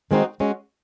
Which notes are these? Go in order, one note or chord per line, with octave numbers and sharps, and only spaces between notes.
D#3 G#3 C4 D#4 F#4
G#3 C#4 F#4